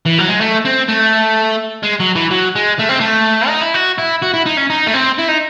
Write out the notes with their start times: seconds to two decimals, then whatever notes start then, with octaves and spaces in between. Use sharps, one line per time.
0.06 E3
0.18 F#3
0.28 G#3
0.40 A3
0.65 C4
0.88 A3
1.83 G#3
2.00 F#3
2.15 E3
2.30 F#3
2.55 G#3
2.79 A3
2.89 C4
3.00 A3
3.48 D#4
3.61 E4
3.74 F#4
3.98 E4
4.22 F#4
4.34 E4
4.46 D#4
4.57 C#4
4.70 D#4
4.86 A3
4.94 C4
5.18 E4
5.28 D#4